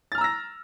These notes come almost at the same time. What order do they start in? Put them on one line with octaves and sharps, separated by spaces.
A6 F6 A#5 E6 A#6